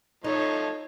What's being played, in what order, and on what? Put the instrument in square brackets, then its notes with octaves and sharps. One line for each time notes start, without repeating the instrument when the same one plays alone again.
[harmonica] F3 A3 D#5 [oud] D#4 [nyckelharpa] C#5